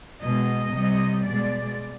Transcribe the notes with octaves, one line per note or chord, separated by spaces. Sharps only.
B2 G#3 D#5
C3 G3
B2 G#3 D5